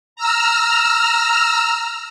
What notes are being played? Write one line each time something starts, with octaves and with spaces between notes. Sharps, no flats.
A#5 E6 F6